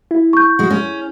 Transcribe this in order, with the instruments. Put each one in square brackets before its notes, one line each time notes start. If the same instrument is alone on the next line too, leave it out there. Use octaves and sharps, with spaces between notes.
[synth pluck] E4
[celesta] C#6 G6
[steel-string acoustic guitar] G#3 F#4
C#4